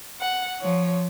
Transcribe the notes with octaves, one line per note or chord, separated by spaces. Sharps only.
F#5
F3 C#5